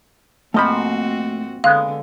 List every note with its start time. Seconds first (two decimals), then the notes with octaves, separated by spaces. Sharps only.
0.54 G#2 F3 A3 A#3 C4 F#4 D#5 B5
1.64 D3 G#3 B3 F5